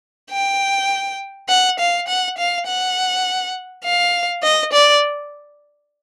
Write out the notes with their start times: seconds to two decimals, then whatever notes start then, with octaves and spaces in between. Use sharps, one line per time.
0.31 G5
1.49 F#5
1.79 F5
2.08 F#5
2.38 F5
2.67 F#5
3.84 F5
4.43 D#5
4.72 D5